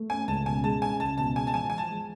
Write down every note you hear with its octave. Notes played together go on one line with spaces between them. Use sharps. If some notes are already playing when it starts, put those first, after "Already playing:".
Already playing: A3
C#4 G#5
C#2 A5
B2 G#5
G#3 A5
C#4 G#5
C#2 A5
B2 A5
G#3 G#5
A5
F3 G#5
F3 G#5
A5
G#3